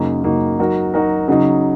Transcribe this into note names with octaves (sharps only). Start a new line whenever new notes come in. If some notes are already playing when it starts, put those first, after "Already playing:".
Already playing: F#2 C#3 A#3 D#4 F#4
F#2 C#3 A#3 D#4 F#4
F#3 D#4 F#4 A#4
F#3 D#4 F#4 A#4
C#3 F#3 D#4